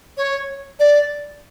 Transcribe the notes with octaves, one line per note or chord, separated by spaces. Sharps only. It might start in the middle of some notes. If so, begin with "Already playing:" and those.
C#5
D5